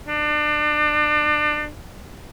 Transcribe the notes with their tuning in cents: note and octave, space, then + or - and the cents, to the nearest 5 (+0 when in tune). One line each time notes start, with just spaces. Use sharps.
D4 +30